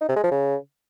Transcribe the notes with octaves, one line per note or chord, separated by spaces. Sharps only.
D#4
C3
G#3
F3
C#3